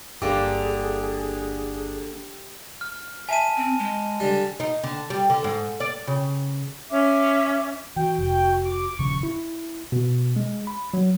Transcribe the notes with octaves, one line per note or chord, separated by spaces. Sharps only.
G1 D3 A#3 G4 G#4 D6
F6
E5 G#5 A5 D#7
C4
G#3
D3 G3
D#4
D3
G3
D3
G#2
D5
C#3
C#4 E5 D6
E3 F#4 G5
F1 G5
D6
D#1 C#3 F3 C#6
E4
B2
G#3
B5
F#3